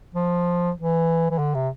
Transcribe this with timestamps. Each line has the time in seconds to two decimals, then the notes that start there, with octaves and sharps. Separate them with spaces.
0.15 F3
0.76 E3
1.31 E3
1.38 D3
1.54 C3